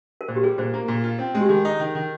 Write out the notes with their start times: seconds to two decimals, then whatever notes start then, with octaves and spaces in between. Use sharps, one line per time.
0.21 A#4
0.28 A#2 C5
0.36 G4
0.43 G3 G#4
0.58 A#2 C5
0.74 A#3
0.88 A#2
1.04 F4
1.19 C4
1.35 G#3
1.41 G4
1.49 D#3 G#4
1.65 D#4
1.80 D#3
1.95 D#3